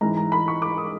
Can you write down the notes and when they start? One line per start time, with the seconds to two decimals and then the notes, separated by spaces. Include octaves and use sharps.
0.01 G#2 E3 A#5
0.17 A#5
0.32 B5
0.48 C#6
0.62 D6
0.78 D#6